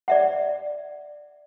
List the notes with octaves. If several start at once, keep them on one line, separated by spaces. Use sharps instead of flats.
D5 E5 F#5